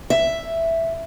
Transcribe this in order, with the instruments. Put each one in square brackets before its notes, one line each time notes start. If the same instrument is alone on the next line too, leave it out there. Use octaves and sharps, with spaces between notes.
[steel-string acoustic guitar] E5